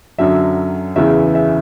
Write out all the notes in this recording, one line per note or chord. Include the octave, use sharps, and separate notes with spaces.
F#2 D3 F#3 E5
E2 C#3 E3 E5
E5